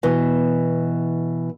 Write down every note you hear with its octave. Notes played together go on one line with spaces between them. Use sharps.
B2 E3